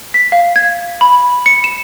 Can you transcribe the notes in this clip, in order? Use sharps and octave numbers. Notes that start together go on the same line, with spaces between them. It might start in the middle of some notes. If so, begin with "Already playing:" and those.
B6
F5
G#6
B5
C#7
E7